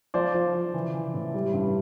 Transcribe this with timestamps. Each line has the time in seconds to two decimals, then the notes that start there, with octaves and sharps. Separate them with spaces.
0.14 F3 C5 D5
0.34 F3
0.54 F3
0.74 E3
0.94 E3
1.14 A2
1.34 G3
1.54 G2